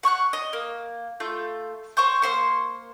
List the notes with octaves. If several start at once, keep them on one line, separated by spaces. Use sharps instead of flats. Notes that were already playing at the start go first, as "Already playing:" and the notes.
F#5 C#6 F6 F#6
D#5
A#3
A3 F4 G6
C5 G5 C#6 G6
A#3 E4 C5 C#6